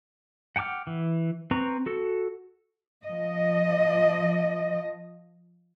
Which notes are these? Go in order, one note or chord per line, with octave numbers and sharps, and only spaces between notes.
F#5 G5 A5 D6 F6
E3
C4 B4 A#5 C#6
F#4 A4
F3 D#5